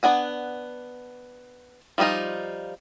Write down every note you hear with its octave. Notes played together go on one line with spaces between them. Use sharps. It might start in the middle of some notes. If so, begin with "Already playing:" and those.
B3 D4 F#5 G#5
F3 G3 B3 D#4 F4